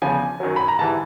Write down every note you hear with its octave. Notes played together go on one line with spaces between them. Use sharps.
E2 C#3 F3 G#5
F#2 D#3 F#3
B5
A#5
G#2 E3 G3 A5